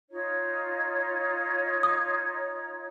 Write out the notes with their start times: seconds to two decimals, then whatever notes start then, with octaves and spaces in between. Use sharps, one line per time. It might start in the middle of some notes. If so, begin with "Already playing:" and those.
0.10 D#4 F4 C#5
1.83 D#6